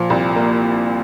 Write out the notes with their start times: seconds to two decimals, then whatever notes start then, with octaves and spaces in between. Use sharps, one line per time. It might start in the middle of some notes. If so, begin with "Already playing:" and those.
Already playing: A#2 F3
0.10 C2
0.36 A#3